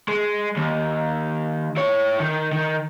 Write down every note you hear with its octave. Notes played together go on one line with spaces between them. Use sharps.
G#3
D#2
E4 C#5
D#3
D#3